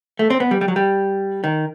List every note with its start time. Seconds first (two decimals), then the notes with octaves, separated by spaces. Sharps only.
0.19 A3
0.30 C4
0.40 B3
0.51 G3
0.61 G3
0.68 F#3
0.76 G3
1.44 D#3